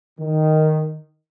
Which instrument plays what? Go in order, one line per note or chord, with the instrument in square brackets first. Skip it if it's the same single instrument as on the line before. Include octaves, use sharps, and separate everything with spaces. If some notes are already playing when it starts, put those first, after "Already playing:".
[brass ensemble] D#3